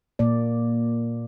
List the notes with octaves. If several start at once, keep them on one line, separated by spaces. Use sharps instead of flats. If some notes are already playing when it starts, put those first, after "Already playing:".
A#2 A#3 D5